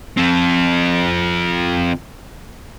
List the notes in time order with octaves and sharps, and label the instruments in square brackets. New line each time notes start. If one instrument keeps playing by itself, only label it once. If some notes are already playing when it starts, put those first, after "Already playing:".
[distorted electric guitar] F3 C4